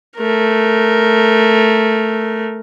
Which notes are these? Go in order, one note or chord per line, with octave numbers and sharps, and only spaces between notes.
A3 A#4